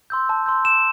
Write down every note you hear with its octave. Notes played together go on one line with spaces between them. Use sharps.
C6 E6 G6
A5
C6 E6 G6
A5 E7